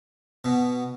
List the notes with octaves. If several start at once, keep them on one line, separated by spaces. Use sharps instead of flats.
B2